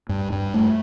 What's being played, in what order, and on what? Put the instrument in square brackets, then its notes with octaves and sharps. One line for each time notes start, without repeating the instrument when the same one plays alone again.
[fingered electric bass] G2
G2
A3